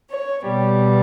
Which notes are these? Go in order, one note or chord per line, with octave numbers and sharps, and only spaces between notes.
C#5
B2 G3